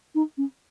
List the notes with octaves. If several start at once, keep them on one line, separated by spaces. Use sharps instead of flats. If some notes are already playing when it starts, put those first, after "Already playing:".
D#4
C#4